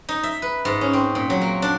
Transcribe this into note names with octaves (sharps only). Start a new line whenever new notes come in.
D#4
E5
B4
G#2
C#4
C4
A#2
F#3
A#3
D4